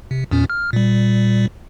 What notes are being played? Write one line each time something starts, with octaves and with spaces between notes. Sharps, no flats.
C3
E2 A#2 C#4
F6
A#2 G3